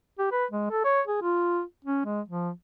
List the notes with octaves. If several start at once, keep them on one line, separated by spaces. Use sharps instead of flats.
G4
B4
G#3
A4
C#5
G#4
F4
C#4
G#3
F3